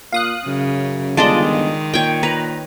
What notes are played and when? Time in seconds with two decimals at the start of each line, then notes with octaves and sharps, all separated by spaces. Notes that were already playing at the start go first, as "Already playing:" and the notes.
0.12 A#2 F5 D#6 F#6
0.46 F#2 C#3
1.17 G1 D#3 G#3 D4 F4 D5 D#5 A5
1.94 A#2 C#5 G5
2.23 B4 A#5